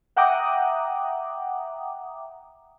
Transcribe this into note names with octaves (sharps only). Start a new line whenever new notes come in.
E5 F#5 G5 A#5 D6 D#6